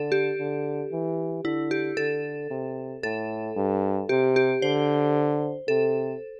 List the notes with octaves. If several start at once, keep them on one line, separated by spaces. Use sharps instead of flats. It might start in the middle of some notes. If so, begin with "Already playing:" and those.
Already playing: D3 A4
G4
D3
E3
D3 E4
G4
D3 A4
C3
A2 A4
G2
C3 G4
G4
D3 C5
C3 A4